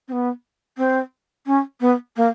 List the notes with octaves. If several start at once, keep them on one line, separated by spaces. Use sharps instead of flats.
C4
B3
C4
C#4
B3
A#3